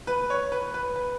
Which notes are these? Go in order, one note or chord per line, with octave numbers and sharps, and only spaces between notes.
B4
C#5
B4
B4
B4